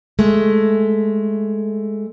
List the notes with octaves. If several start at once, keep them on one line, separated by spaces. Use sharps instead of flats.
G#3 A3